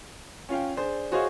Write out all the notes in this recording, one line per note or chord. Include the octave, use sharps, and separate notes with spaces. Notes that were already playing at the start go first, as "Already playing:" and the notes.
C#4 F4 F5 G5
D4 G#4 C5
F#4 G#4 C5 C#5 D#5 F5